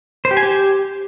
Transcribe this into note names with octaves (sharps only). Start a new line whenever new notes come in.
C5
G4
G#5
G4